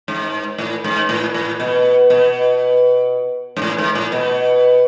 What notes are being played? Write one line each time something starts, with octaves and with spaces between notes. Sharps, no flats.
G#2
A2
G#2
A2
A2
B2
B2
G#2
A2
G#2
A2
B2